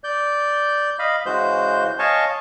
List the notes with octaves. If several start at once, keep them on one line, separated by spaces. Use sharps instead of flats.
D5 G6
D#5 F5 B5
C#3 E3 G#3 F#4 C5 G6
C#5 D#5 F5 G#5 A5 C#6